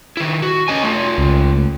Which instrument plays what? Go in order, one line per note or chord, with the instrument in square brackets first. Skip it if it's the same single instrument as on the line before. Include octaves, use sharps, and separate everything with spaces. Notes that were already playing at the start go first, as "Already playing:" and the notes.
[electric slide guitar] D#3 E4
F#4
C#4 D#5 G#5
A3 F4
[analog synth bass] C#2